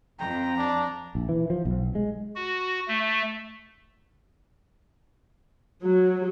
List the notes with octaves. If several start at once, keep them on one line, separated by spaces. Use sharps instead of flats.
F2 G5 A#5
D4
A#1
E3
F3
B1
G#3
F#4
A3
F#3